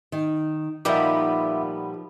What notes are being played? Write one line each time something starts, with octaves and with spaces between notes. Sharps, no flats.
D#3
A#2 F3 G3 B3 D#4 A#4 E5 D6